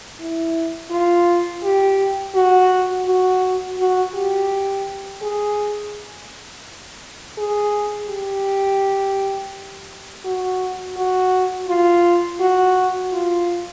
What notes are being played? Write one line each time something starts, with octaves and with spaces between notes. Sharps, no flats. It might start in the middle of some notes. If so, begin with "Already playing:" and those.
E4
F4
G4
F#4
F#4
F#4
G4
G#4
G#4
G4
F#4
F#4
F4
F#4
F4